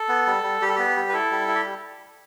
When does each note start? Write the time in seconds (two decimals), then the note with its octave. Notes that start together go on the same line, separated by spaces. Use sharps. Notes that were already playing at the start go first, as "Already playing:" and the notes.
Already playing: A4
0.09 B3
0.27 G3
0.43 G3
0.61 G3 G4
0.68 A4
0.76 B3 G4
0.96 G3
1.09 B4
1.13 E4 A4
1.31 G3
1.48 E4
1.55 G4